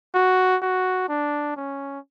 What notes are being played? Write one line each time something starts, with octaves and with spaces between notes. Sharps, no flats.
F#4
F#4
D4
C#4